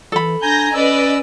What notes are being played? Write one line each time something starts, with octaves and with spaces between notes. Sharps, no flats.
E3 A4 B5
D4 G#5 A#5 G6 A#6
C#4 B4 D5 D#5 E6